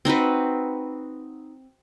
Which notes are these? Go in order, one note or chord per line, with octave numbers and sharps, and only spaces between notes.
C4 D#4 F#4 B4